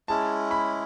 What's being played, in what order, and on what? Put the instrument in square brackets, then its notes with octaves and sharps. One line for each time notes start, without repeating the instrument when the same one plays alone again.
[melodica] G#3 C#4 E4 G#4 [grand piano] A5
[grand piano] B5